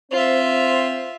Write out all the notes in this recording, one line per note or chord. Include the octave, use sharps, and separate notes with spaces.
C4 F4 C5 E5